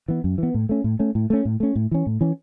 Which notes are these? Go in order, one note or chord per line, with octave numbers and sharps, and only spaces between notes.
E3 B3
F#2
E3 B3
A2
A3 C#4
A2
A3 C#4
A2
A3 C#4
A2
A3 C#4
A2
E3 C#4
A2
E3 C#4